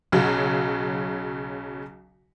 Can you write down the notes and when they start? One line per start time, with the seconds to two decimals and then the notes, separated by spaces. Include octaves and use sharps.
0.12 B1 C#3 F#3